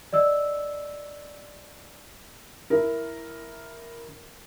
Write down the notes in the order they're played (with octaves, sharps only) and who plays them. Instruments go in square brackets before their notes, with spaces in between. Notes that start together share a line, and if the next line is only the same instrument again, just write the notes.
[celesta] D5 D#5 E6
[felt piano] E4 A#4